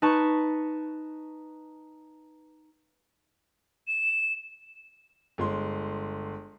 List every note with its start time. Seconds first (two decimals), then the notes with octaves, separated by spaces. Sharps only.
0.02 D#4 B4 A5 C#6
3.88 E7
5.38 G1 G#3 C6